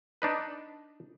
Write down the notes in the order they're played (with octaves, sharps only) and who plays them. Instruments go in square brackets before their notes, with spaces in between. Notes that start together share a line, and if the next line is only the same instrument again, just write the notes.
[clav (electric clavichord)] D4 D#4 B4